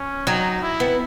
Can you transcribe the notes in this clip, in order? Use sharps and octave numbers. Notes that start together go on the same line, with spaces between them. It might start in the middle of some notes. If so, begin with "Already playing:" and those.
Already playing: C#4
F#3 D#4
E4
B3